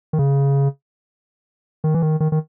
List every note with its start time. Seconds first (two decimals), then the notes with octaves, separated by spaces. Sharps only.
0.13 D#3
0.19 C#3
1.84 D#3
1.94 E3
2.02 D#3
2.20 D#3
2.32 D#3